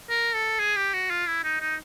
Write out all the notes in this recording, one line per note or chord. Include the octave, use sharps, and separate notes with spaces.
A#4
A4
G#4
G4
F#4
F4
E4
D#4
D#4